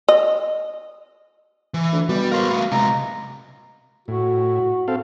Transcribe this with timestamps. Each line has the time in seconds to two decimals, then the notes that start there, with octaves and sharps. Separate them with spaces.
0.09 D#5
1.74 E3
1.92 D2
2.09 B2 G3
2.32 A#4 C5 F5 C6
2.49 A3 B3
2.72 C3 G#3 A#5
4.08 A2 F#4
4.88 C4 A4 F5